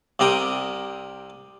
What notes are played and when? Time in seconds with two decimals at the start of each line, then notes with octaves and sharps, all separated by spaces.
0.19 C2 C3 A#4 G5 D#6